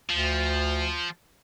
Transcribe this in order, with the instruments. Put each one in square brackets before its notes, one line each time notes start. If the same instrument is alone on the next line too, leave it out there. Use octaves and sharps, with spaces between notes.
[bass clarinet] D2 [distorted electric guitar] F3